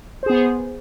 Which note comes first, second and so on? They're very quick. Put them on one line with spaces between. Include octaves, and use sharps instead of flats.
C5 G#4 B3